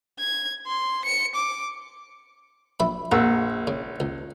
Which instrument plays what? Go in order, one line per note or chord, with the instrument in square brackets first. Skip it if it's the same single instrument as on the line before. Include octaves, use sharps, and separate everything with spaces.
[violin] G#6
C6
C#7
D6
[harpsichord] A#1 E5 B5
[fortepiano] A#1 F#5 E6 [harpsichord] A#4
[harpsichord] C#3
C#2